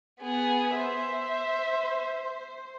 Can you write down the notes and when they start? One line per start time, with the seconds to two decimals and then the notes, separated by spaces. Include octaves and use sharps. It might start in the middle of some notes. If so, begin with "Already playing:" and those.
0.20 B3 G#4
0.76 C5 E5